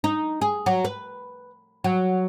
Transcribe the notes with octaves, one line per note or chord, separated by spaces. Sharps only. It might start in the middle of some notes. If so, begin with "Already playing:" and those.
D#4
G#4
F#3
B4
F#3